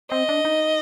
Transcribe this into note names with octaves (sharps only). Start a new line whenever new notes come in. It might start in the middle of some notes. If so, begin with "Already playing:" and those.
C4 D#5
D4
D#4